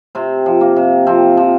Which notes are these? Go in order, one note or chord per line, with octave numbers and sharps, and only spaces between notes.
C3 C4
F3
A#3
C3
F3 C4
F3